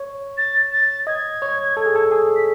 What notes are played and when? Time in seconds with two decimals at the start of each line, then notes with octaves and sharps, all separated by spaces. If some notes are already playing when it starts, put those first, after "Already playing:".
Already playing: C#5
0.38 A6
0.72 A6
1.07 D#5 G#6
1.42 C#5
1.77 A4
1.86 G#4
1.96 A4
2.11 G#4
2.36 B6